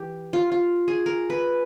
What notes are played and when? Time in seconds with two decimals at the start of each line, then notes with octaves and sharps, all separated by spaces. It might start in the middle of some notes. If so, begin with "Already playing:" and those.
Already playing: E3 G4
0.33 F4
0.52 F4
0.88 G#4
1.06 A#4
1.30 B4